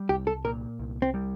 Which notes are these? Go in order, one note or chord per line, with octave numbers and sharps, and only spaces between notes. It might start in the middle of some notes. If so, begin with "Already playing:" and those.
Already playing: G3
C2 G4
A4
A#2 A#4
C2
C4
G3